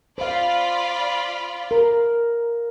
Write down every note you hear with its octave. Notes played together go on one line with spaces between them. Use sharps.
F4 C5 D5 F5 B5
A#4